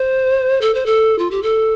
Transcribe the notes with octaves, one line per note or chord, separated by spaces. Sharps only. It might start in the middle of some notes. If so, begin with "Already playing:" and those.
Already playing: C5
A4
C5
A4
F4
G4
A4